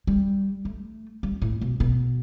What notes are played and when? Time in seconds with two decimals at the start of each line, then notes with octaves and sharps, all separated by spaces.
0.07 G3
0.65 A3
1.23 G3
1.42 A2
1.61 B2
1.80 B2